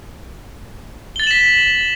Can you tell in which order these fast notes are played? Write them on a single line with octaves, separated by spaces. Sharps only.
G7 A6 F#7 E7 B6